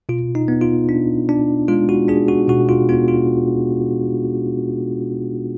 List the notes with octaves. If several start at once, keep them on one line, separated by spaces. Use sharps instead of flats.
B2 F4
D#4
B3
F4
D4
D4
G#3 F4
F#4
D4 G#4
F#4
B2 F#4
F4
B3 F4
F4